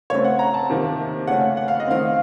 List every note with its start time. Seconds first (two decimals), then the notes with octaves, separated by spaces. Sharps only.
0.10 C#3 A3 C4 C#5
0.24 F#5
0.39 A#5
0.54 A5
0.70 C3 D#3 A#3
1.27 C#3 A3 C#4 F#5
1.57 F#5
1.68 F5
1.80 D#5
1.87 D#3 A3 C4 F5